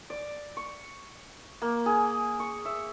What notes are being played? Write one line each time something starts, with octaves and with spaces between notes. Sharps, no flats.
D5
C#6
A#3
G#4
C#6
E5